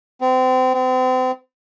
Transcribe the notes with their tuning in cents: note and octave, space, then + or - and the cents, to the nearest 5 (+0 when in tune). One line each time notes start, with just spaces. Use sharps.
C4 -30
C4 -35